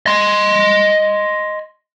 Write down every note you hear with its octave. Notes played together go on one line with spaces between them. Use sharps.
D#5 C6